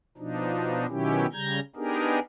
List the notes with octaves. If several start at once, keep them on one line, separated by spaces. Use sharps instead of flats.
B2 F3 D4 D#4
B2 D#3 F#3 C#4 E4 G4
C#3 G3 A#5 G6 G#6
B3 D4 D#4 G4 G#4 A#4